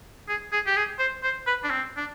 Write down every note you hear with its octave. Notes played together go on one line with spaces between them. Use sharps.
G#4
G#4
G4
G#4
C5
C5
B4
D4
C4
D4